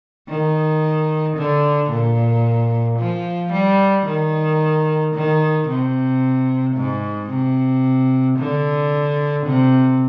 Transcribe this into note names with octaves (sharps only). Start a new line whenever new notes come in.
D#3
D3
A#2
F3
G3
D#3
D#3
C3
G#2
C3
D3
C3